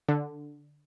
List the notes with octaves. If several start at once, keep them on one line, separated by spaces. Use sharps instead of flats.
D3